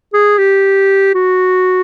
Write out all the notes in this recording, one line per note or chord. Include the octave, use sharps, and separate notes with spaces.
G#4
G4
F#4